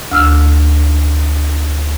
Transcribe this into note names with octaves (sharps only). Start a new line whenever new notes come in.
D2 E6 F6